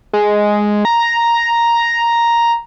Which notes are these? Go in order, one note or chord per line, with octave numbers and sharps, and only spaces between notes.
G#3
A#5